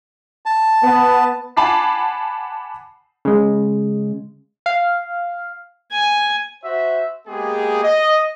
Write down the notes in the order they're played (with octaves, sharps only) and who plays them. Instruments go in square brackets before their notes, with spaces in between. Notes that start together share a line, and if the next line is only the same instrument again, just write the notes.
[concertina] A5
[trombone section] B3
[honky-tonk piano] F#5 G#5 A5 B5 D6 C7
[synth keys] C#3 G#3
F5
[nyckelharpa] G#5
[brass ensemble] F#4 C5 E5
G#3 A#3 B3 G4 G#4
D#5